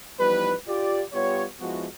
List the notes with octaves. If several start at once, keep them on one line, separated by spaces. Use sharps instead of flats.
E3 F3 G3 B3 D#4 B4
F4 G4 D5
G3 B3 F4 G4 C#5
F3 G#3 B3 E4 F#4